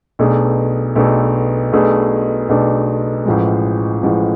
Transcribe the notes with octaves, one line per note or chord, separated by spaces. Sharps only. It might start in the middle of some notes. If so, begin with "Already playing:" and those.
B1 B2 A3 D4 G#4
B1 B2 A3 D4 G#4
B1 B2 A3 D4 G#4
B1 B2 A3 D4 G#4
A1 A2 F3 G#3
A1 A2 F3 G#3